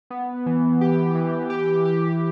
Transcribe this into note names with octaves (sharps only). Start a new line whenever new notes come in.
B3
E3
G4
E3
G4
G4